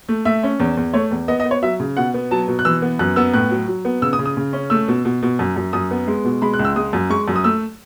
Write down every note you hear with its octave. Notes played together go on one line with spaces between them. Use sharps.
A3
A3 E5
C#4
E2
E2
A3 C#5
E2
B3 D#5
D#5
B3
C#5
F#3 E5
C#3
B2 F#5
B3
F#3 A5
B2
F#6
E3 E6
B3
F#2 F#6
B3 E6
A2 F#6
F#3
F#3
B3
C#3 E6
D#6
C#3
D#6
C#3
C#4
A3 E6
B2
B2
B2
F#2
F#2
F#2 D#6
B3
G#3
B2
G#3 B5
F#6
C#2
E6
G#3 D#6
F#2
G#3 C#6
F#2
D#6
A3 E6